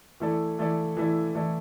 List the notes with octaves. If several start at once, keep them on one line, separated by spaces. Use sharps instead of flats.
E3 A3 E4 A4 D5
E3 A3 E4 A4 D5
E3 A3 E4 A4 D5
E3 A3 E4 A4 D5